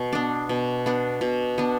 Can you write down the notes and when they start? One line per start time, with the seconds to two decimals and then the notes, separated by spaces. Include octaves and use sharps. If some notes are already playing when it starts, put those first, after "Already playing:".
Already playing: B2
0.13 B3 D4
0.49 B2
0.86 B3 D4
1.21 B2
1.58 B3 D4